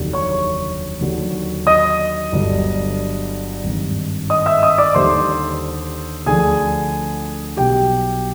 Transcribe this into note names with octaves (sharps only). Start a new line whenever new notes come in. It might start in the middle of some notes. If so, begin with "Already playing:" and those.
Already playing: F1 D#2 D3 F#3
C#5 C#6
D#2 D3 F#3
D#5 D#6
G1 G2 D3 F#3
G#1 G2 D#3
D#5 D#6
E5 E6
D#5 D#6
D5 D6
D#2 D3 G3 C5 C6
D2 D3 F3 G#4 G#5
B1 B2 G3 G4 G5